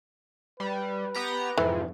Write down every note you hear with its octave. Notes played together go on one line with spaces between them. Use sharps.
G3 B4
B3 G4 A#5
F2 G#2 C3 E3